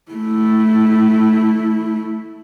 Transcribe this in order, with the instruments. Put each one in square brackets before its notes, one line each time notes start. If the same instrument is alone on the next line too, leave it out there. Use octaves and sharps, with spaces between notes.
[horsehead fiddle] A3 E4